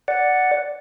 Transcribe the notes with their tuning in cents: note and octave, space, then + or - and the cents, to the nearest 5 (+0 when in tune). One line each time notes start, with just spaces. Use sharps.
D5 +0 F#5 +0